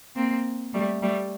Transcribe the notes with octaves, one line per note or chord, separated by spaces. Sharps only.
A#3 C4
G3 A3
G3 A3